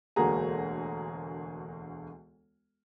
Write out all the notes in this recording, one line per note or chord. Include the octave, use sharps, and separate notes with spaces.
E1 D2 A#3 F#4 G#4 A#5